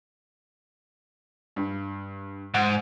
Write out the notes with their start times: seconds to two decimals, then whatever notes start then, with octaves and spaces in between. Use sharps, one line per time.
1.56 G2
2.54 G#2 F#5